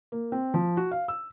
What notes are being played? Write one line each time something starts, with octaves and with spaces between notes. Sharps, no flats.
A#3
C4
F3
F#4
F5
E6